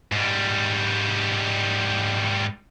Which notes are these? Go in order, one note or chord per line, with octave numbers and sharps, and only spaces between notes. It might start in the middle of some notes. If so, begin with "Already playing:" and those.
G#2 G3